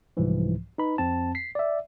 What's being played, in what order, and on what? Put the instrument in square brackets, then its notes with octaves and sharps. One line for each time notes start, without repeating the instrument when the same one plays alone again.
[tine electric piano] C2 G#2 E3 F3
D#4 B4 B5
F2 C4 A5
B6 C7
D5 E5